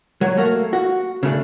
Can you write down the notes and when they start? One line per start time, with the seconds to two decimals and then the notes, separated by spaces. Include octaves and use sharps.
0.21 F#3 C#5
0.37 A3 A#3 F#4
0.73 F#4
1.23 C#3 A3 D4